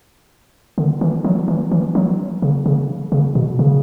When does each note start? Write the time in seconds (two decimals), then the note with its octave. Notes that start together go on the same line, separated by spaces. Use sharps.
0.78 D3
1.01 E3
1.24 F#3
1.48 E3
1.72 E3
1.95 F#3
2.42 C#3
2.66 C#3
3.12 C#3
3.35 B2
3.59 C#3